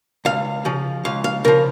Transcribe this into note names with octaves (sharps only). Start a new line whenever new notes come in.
C#2 F5
C#3 F3
C#2 F5
F5
C#3 F3 A#4